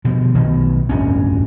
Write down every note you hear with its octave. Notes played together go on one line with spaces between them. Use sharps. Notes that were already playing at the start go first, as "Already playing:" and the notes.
B2 D3 F3
B1 B2 D#3
D1 G1 F2 C#4